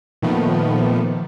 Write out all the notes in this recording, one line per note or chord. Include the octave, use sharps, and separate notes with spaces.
A#2 D#3 F3 A3 B3